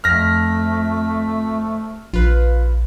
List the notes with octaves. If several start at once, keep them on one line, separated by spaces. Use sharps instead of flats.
F2 A3 F6 A#6 B6
A#1 F4 B4